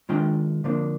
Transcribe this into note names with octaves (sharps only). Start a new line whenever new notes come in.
D#3 G#3 D4 F4 G5
D3 F3 A#3 D4